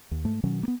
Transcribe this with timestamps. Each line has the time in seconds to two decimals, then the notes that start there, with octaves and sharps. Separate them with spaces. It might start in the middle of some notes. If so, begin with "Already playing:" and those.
0.11 D#2
0.25 G#2 A3
0.43 B2 D#3 F#3 C#4
0.63 A#3 B3